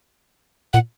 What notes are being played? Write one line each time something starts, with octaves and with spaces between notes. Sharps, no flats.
A#2 F#5